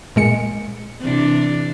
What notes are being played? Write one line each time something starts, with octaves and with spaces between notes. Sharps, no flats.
A#2 G#3 C#7
C3 E3 D4